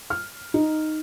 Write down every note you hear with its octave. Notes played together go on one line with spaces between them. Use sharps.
F6
D#4